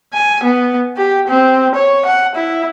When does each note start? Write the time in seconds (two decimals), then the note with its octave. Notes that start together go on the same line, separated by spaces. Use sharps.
0.14 G#5
0.44 B3
0.97 G4
1.28 C4
1.75 C#5
2.06 F#5
2.35 E4